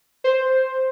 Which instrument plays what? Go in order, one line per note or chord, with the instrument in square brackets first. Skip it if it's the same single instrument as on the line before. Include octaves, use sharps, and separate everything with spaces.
[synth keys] C5